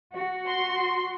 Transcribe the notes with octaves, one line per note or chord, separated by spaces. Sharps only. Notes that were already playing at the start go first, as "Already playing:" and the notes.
F#4
C6